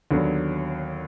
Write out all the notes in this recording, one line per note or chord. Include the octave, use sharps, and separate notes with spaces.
D#2 D3 F#3 B3